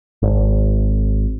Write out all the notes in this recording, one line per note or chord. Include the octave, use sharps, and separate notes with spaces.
G#1